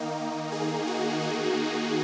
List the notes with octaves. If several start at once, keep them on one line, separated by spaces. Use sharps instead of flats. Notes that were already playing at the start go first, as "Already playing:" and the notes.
Already playing: D#3 A#3 D#4
G#4
F#4
D#4